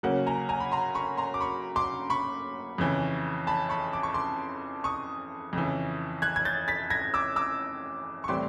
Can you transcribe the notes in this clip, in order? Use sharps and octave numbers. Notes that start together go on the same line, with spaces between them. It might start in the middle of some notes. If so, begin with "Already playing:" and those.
C#3 F#3 A#3 C#4 F#5
G#5 A#5
G#5 A#5
B5
A#5 C6
B5 C#6
A#5 C6
D6
B5 C#6
C6 D6
B5 C#6
F2 C#3 E3
A5 B5
B5 C#6
D6
C#6
C6 D6
C#6 D#6
F2 C#3 E3
F#6 G#6
G#6
G6 A6
A6 B6
G#6 A#6
D6 E6
D6 E6
C#6
A2 E3 G3 C4 C6 D6